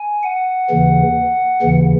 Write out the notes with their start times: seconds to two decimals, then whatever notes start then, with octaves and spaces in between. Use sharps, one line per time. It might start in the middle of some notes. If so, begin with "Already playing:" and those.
Already playing: G#5
0.23 F#5
0.70 D#2 C#3 E3
1.62 D#2 C#3 E3